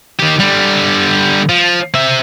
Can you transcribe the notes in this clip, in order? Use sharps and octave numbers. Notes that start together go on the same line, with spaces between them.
D#3 G4
D3 G3
F3
C4 E5